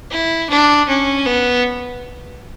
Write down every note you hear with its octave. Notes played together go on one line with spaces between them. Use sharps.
E4
D4
C#4
B3